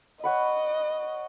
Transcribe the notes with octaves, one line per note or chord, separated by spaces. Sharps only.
C#5 D#5 F#5 B5